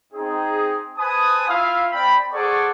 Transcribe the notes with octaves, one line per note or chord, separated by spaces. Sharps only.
C4 D#4 G#4
B4 C5 G#5 A5 D#6
E4 F4 E5 F5
C4 D5 G5 B5
G#4 A4 C5 D5 F#5 C#6